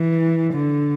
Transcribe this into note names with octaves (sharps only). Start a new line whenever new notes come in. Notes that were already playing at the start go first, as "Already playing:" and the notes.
Already playing: E3
D3